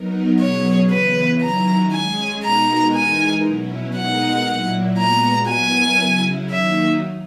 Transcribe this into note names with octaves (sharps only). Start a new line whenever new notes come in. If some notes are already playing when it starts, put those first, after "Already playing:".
Already playing: F#3 B3 D#4 A#4
B2 F#3 C#4 G#4 C#5
C#3 E3 B3 B4
D#3 F#3 C#4 E4 A#5
G#3 C#4 G#4 G#5
B2 G#3 D#4 F#4 A#4 A#5
E3 G#3 D#4 A#4 G#5
B2 F#3 C#4 E4
B2 G#3 D#4 A#4 F#5
A#2 F#3 A#3 E4
A#2 G#3 B3 F#4 A#5
F#3 B3 E4 A#4 G#5
C#3 F#3 C#4 E4
D#3 F#3 A#3 D#4 E5